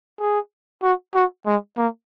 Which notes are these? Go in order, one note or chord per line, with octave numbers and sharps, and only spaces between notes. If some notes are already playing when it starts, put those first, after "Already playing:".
G#4
F#4
F#4
G#3
A#3